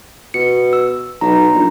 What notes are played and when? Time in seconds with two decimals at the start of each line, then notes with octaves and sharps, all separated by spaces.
0.34 B2 C#7
0.73 E6
1.21 B1 A#5
1.55 A#1